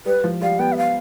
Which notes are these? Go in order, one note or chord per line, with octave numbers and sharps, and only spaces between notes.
G3 B4
F3
G3 F5
B3 G5
E5
F5